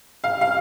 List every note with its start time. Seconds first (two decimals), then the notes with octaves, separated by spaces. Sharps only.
0.24 F5
0.41 F5